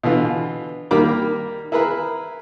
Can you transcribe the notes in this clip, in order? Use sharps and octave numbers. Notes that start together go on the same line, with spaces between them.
B2 D3 E3 F4
D#3 G3 A#3 A#4 B5 D6
E4 G#4 A#4 B4 B5